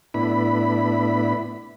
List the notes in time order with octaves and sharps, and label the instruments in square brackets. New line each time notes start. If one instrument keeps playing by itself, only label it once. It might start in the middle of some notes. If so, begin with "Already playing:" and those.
[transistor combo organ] A2 B3 D4 E4 B5